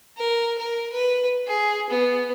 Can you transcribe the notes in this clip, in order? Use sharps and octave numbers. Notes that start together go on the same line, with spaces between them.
A#4
A#4
B4
G#4
B3